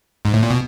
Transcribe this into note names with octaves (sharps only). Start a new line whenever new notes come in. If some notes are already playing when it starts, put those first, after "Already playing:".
G#2
A2
A#2
B2